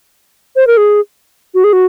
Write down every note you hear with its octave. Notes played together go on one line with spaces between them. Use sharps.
C5
A#4
G#4
F#4
G#4
F#4